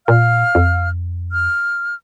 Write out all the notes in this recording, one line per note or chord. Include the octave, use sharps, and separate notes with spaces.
A#2 F5 F6
F2
F6